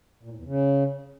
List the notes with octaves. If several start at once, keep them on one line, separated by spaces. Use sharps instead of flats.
A#2
A2
E2
C#3